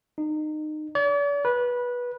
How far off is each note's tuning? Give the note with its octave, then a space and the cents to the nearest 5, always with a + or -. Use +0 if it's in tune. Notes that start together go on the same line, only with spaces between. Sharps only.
D#4 -25
D5 -45
B4 -15